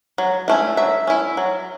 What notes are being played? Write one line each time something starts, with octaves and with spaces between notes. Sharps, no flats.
F#3
A3 C#4 E4
F#3 E5
C#4 E4
F#3